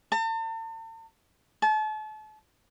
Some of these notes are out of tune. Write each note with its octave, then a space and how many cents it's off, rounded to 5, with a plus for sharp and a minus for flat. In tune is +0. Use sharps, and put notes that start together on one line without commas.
A5 +40
A5 -35